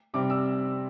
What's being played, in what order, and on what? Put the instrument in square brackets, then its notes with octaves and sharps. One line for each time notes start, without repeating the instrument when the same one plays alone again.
[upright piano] C3 G3 C4 D6
E6